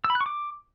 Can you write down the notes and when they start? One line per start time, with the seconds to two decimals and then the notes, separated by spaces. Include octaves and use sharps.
0.04 E6
0.10 B5
0.15 F#6
0.21 C#6
0.26 D6